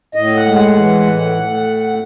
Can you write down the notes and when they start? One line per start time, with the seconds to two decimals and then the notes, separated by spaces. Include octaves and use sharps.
0.15 A2 D#5
0.36 F#5
0.46 G#3
0.56 F#5
0.76 E3
1.07 A2
1.37 A2